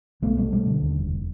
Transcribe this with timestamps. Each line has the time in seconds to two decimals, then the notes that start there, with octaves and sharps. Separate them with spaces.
0.22 B1 A3 B3
0.37 B2 G3 A3
0.52 B2 G3 A3
0.67 D3
0.82 D#2
0.97 F1